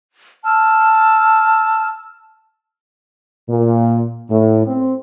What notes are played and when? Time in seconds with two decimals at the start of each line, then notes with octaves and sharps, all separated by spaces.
0.45 A5 E6 F6
3.49 A#2
4.30 A2
4.66 C4